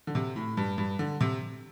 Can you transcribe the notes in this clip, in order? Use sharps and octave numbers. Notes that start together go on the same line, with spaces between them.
D3
C3
A2
G2
G2
D3
C3